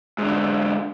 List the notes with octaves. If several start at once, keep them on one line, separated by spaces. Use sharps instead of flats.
G#2 D3